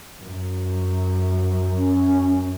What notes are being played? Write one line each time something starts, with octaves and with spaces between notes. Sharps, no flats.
F#2
C#4